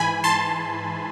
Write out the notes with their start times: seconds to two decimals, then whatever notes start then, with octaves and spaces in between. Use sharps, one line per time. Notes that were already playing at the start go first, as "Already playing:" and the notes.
Already playing: G#2 E3 G#5 B5
0.24 A5 C6